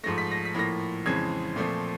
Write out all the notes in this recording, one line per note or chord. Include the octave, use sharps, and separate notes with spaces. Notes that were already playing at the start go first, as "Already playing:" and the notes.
G#2 F3 A3 A#6
B6
A#6
B6
A2 F3 A#3 A#6
F2 C#3 E3 G#3 C4 G#6
A#2 F3 A3 C4